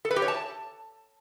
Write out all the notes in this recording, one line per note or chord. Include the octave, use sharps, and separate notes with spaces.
A4
B4
G4
C#5
A5